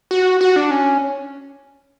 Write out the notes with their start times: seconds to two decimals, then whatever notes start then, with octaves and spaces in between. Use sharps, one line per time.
0.11 F#4
0.41 F#4
0.56 D4
0.71 C#4